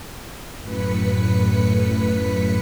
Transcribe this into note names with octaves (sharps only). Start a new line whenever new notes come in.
F#2 A2 B4 B6 C#7